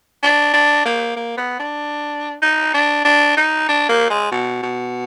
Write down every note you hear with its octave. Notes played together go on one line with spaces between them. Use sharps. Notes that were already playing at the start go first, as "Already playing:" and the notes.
D4
D4
A#3
A#3
B3
D4
D#4
D4
D4
D#4
D4
A#3
G#3
B2
B2